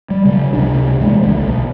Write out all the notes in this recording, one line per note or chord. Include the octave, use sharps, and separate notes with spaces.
G3
C#3 F#3
C#2 C3 D4
A#2 E3 F3 G#3
C#2 D3
B1